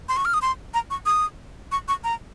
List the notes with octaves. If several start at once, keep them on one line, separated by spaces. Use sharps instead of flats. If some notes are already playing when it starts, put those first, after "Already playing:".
C6
C#6
F6
D#6
C6
A#5
C#6
D#6
C#6
C#6
A#5